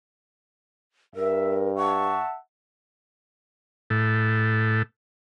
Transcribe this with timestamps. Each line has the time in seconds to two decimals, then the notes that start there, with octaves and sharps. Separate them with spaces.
1.16 G2 A#4 E5
1.76 E5 F#5 A5 C#6
3.90 A2